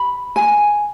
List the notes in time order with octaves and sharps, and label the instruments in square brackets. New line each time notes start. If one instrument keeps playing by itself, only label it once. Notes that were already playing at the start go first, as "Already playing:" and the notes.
Already playing: [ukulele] B5
G#5